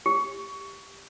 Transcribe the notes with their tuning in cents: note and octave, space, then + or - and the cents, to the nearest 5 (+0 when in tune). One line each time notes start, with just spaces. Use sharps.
G4 +10